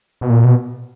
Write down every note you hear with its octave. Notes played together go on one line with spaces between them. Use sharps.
B2
A#2
B2